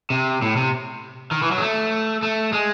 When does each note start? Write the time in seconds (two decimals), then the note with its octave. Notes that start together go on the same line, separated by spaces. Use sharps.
0.10 C3
0.42 A2
0.56 C3
1.31 D#3
1.42 E3
1.51 F#3
1.58 G#3
1.61 A3
2.23 A3
2.53 G#3